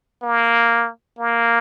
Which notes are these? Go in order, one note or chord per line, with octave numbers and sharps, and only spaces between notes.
A#3
A#3